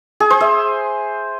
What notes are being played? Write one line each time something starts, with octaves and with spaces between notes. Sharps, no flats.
G#4
C5
E5